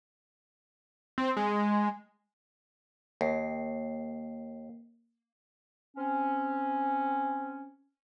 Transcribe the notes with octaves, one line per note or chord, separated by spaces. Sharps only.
C4
G#3
D#2 A#3 C7
C4 C#4